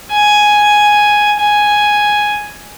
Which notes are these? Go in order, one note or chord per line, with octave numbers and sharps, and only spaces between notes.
G#5
G#5